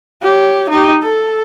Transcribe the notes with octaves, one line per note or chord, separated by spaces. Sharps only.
G4 C#5
D#4 G4
A4